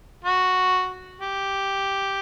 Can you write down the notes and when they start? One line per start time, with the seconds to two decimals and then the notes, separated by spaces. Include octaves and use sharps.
0.25 F#4
1.21 G4